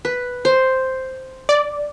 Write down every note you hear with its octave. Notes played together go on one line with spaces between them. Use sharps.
B4
C5
D5